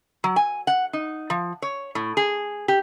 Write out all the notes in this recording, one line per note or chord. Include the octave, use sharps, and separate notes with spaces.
F#3
G#5
F#5
D#4
F3
C#5
A2
G#4
G4